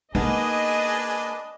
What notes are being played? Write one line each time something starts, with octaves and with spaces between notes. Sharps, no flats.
A#3 B3 D4 D#4 G#4 B4 D#5